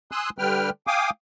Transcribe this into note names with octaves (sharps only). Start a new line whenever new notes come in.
G#5 C6 D#6 E6 F#6
D3 G3 B4 G5 F6
F5 G5 G#5 D6 D#6